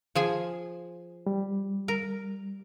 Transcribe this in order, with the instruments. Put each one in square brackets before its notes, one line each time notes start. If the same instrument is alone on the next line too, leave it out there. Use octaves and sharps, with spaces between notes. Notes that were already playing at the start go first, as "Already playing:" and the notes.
[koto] F3 G#4 G#5
[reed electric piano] G3
[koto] A#4